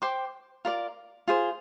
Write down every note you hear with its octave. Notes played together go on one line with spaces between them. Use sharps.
C5 G5 D6
F4 A#4 D5
F4 G#4 C5